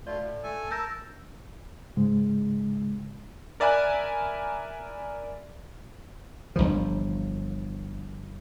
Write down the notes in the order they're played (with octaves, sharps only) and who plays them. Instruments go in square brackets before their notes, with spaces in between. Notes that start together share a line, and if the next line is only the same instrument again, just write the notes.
[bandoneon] D2 A3 F4 [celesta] D5
[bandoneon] A2
A3 A4 G#5
[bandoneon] A#4 A5 [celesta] E6 G6 A#6
[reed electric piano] G#2 C#3 G#3
[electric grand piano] A#4 D5 E5 G#5 B5 F#6
[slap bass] G1 D2 E3 F3